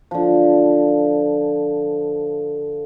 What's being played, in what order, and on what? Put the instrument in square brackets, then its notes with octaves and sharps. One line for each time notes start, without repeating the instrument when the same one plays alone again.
[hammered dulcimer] D3 F3